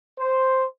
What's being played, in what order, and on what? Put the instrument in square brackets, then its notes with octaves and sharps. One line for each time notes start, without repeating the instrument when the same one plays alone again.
[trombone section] C5